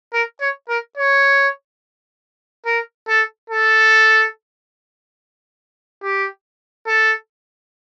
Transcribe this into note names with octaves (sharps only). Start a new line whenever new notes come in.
A#4
C#5
A#4
C#5
A#4
A4
A4
G4
A4